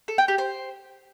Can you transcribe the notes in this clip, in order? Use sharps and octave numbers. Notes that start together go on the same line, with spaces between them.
A4
G5
G4
C5